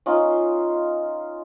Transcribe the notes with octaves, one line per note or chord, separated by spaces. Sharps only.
C#4 D#4 F4